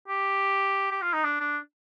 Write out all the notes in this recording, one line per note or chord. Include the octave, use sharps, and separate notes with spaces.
G4
G4
F4
D#4
D4
D4